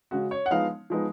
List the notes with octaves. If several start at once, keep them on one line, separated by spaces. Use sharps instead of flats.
C#3 G#3 C#4 F#4
C#5
F#5
F3 G#3 B3 D#4 F5
F3 G#3 B3 D#4